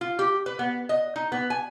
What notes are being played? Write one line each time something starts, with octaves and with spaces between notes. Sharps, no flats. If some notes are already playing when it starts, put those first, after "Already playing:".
F4
G4
B4
B3
D#5
D#4
B3
G#5